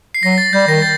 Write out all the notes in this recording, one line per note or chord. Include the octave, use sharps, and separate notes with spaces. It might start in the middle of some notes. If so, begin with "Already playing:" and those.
C7
F#3 A#6
A6
G3 G6
D#3 A#6
A6